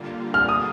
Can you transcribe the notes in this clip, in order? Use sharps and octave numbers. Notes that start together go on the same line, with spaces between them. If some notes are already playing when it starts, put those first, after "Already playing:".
Already playing: D3 G3 A#3 F4
F6
D#6